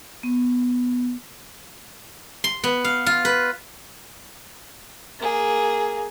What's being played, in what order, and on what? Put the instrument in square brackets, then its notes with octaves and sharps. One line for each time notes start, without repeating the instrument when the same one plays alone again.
[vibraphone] B3
[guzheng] C6
B3
F5
F4
B4
[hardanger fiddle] A#3 G#4